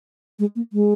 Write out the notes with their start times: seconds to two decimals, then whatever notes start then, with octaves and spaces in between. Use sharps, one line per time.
0.39 G#3
0.56 A#3
0.73 G#3